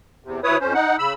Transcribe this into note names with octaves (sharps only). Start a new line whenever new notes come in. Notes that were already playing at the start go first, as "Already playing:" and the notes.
E2 C3
D2 E4 B4 C#5 D#6
F2 C#4 C5
D#4 F#5
C#3 B5 E6